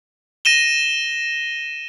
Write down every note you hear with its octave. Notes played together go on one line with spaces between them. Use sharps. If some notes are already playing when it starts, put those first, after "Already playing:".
A#6 D#7 E7 G7